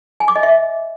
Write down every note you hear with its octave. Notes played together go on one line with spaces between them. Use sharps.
G#5
D6
D#5
E5